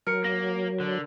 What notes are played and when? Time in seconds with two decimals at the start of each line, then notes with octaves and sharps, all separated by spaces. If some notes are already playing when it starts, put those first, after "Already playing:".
0.07 F#3 A#4 F6 C#7
0.24 A#3 A#6
0.80 D3